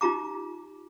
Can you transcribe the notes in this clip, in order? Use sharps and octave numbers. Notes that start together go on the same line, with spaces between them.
D#4 F4 G4 A#5 D6